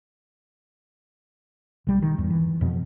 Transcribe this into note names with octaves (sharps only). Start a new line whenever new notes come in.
B1 G3
D#3
E2 G2
E3
E1 F2 B2